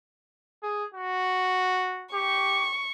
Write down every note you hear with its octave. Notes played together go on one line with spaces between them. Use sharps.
G#4
F#4
G4 C#6